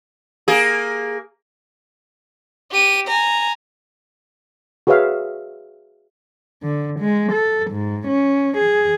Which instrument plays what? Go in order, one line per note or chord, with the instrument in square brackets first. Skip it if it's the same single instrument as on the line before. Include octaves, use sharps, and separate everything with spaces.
[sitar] A#3 G#4
[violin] G4 D#7
G#5 A#5
[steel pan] F#4 G#4 B4 C#5 E5 F5
[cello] D3
G#3
A4
G#2
C#4
G#4